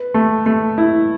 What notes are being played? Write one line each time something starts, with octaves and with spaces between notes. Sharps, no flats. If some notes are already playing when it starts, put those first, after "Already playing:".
Already playing: B4
A3
A3
E4